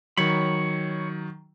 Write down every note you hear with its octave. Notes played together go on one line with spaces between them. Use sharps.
D#3 F#3 C#5 B5